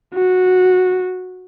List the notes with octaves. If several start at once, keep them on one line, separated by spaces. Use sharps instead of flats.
F#4